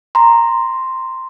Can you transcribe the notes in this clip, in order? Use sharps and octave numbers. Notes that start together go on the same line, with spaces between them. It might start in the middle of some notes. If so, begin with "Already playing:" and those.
A#5 C6